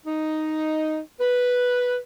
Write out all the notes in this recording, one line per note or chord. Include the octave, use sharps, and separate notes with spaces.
D#4
B4